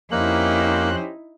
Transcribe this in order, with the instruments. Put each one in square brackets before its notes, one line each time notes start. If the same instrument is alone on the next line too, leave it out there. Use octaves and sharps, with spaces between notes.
[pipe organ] F2 F#6 [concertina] A#3 [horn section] C#4 G4 C5 [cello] D#4 E4